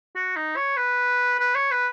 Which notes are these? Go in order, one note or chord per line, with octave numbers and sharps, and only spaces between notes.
F#4
D#4
C#5
B4
B4
C#5
B4